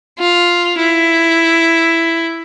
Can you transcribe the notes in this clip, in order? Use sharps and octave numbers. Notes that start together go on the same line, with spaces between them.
F4
E4